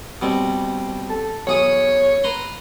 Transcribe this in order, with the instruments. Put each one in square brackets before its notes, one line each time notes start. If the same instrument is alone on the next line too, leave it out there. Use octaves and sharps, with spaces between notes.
[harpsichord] B2 G3 C4
[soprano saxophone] A4
[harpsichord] B1 G#4 D#6 [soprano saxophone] C#5
[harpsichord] B4 A#5 C6